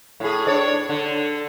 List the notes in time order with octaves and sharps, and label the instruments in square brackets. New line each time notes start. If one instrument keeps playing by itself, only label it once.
[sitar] A2 G#4
D4 C#5 D5
D3